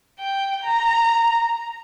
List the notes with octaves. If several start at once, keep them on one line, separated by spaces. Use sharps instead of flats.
G5
A#5